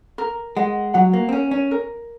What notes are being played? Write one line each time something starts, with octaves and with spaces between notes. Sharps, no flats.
A#4
G#3 F#5
F#3 F#5
A#3
C4
C#4 A#4
C#4
A#4